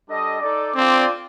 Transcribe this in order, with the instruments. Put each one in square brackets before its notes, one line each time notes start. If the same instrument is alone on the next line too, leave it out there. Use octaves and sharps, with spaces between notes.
[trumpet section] G3 D4 A4 D#5
D#4 A4 D5
[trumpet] C4 [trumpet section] D4 F4 A4 D5